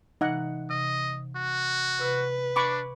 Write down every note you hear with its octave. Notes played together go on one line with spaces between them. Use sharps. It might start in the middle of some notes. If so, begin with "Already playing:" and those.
C3 E3 D#4 F#5 A#6
C3 D#5
F#4
C3 B4
D4 B5 C#6 D6